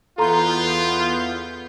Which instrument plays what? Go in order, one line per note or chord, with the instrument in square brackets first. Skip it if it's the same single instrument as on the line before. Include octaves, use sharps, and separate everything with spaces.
[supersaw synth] E2 B3 G6 [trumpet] F4 [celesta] A4 A#5 C6